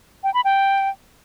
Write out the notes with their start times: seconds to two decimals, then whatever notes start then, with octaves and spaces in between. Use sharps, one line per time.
0.24 G5
0.34 B5
0.44 G5